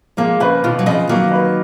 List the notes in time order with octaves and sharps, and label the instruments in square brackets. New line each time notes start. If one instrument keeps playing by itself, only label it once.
[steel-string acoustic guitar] F3 G#3 [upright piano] A#3
[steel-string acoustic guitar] C#3 F3 [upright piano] B4
[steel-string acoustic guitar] B2 D#3 [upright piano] F4
[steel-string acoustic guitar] F#3
[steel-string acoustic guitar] C#3 F3 [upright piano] D#5
[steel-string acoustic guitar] D#3 F#3 [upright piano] A#3
[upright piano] B4